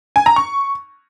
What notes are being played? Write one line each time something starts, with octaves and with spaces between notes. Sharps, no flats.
G#5
A#5
C#6